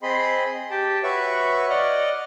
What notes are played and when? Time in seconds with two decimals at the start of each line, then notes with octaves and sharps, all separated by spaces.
0.03 C4 G#4 D#5 B5 C6
0.71 G4 G5 A5
1.03 F#4 B4 C#5 E5 C#6
1.70 D5 D#5 F#5 F6